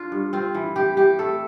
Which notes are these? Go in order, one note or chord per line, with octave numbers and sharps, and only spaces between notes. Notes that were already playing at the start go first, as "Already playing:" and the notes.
Already playing: D4 F4
G2
C4 F4
E3
E3 G4
E3 G4
A3 A4